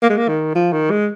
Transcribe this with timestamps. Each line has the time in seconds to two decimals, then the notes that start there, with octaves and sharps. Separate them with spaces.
0.02 A#3
0.10 G#3
0.17 A#3
0.29 D#3
0.55 F3
0.73 D#3
0.91 G#3